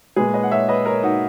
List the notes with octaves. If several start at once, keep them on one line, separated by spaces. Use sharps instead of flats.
A#2 G#3 G#4 B4
B4 D#5
F#5
C#5 E5
B4 D#5
A#4 C#5
D#4 F#4